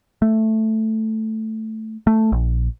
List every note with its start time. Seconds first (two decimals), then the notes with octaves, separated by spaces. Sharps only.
0.22 A3
2.07 A3
2.32 A#1